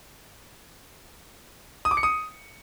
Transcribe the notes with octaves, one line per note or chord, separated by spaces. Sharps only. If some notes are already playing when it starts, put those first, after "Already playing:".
D#6
D6
C#7
D#6